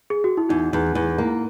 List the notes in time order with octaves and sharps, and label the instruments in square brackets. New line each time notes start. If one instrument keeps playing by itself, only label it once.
[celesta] G#4
F#4
E4
[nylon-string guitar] E2 [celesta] D#4
[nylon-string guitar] E2
E2
A#3